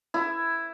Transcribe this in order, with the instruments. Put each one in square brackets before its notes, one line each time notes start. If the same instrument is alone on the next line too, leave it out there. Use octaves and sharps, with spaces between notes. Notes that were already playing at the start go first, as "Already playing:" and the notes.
[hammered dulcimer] E4